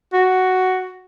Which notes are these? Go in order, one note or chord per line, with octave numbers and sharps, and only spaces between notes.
F#4